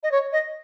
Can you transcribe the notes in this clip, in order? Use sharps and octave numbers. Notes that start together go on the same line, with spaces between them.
D#5
C#5
D#5